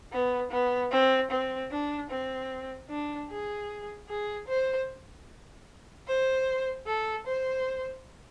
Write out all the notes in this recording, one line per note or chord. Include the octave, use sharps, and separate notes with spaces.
B3
B3
C4
C4
D4
C4
D4
G#4
G#4
C5
C5
A4
C5